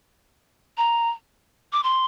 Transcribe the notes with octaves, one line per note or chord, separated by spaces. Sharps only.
A#5
D6
C6